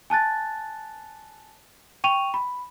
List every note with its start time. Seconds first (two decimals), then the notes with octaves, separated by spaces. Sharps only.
0.10 G#5 A5 F#6 A6
2.04 G5 C#6 D#7 F7
2.34 B5